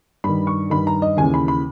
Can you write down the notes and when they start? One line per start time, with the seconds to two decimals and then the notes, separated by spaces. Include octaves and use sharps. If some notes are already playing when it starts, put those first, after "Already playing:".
0.24 G2 D#3 B5
0.47 C#6
0.70 G2 D#3 B5
0.87 A#5
1.02 D#5
1.17 D#2 C#3 E3 G#5
1.34 B5
1.48 B5